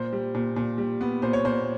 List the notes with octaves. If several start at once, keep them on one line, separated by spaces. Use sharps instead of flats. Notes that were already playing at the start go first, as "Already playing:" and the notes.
Already playing: A#2 C5
G3
A#2
A#2
G3
B3
A#2 C5
C#5
A#2 C5